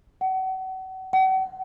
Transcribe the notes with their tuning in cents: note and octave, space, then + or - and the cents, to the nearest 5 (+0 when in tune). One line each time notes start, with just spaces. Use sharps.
F#5 +35
F#5 +40